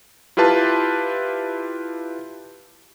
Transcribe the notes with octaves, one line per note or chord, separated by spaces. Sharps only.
E4 F4 G4 B4 A5 C6